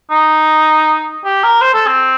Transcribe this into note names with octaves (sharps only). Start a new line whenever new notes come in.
D#4
G4
A#4
C5
A4
C4